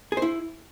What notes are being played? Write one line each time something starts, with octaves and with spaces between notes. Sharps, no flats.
G#4
C5
E4